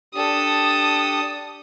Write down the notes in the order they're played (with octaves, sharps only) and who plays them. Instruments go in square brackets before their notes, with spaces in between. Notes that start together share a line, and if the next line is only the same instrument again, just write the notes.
[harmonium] D4 G4 [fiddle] A4 D#6